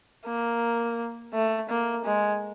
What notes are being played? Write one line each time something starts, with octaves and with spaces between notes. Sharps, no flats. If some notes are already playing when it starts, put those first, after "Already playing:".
A#3
A3
A#3
G#3